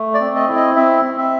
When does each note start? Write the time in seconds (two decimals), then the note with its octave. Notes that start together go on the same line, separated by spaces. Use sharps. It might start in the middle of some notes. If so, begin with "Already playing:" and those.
Already playing: A3
0.14 D5
0.20 C4
0.35 D#5
0.49 E4
0.56 D#5
0.76 C4 E5
1.04 C4
1.18 E5